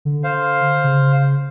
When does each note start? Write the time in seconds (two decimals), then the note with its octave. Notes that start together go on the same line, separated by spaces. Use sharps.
0.05 D3
0.24 C5 F5
0.84 C#3